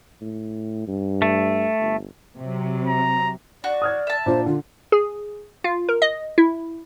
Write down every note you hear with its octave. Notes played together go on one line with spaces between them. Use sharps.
A2
G2
A3
G1
C3 F#3
A#5
F#4 D5
D#6 F6 G#6
E5 A5
A#2 D4 F4 C5
D3 F4
G#4
F4
A#4
D#5
E4